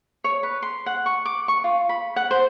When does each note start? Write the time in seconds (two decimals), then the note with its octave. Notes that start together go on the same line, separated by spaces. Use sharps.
0.24 C#5
0.43 B4
0.62 C6
0.86 F#5
1.06 C#6
1.25 D6
1.48 C#6
1.64 F4
1.89 B5
2.16 F#5
2.31 C5